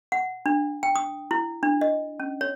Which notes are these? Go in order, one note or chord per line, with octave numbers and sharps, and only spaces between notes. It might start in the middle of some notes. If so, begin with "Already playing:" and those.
F#5
D4
G5
D#6
E4
D4
D#5
C#4
C#5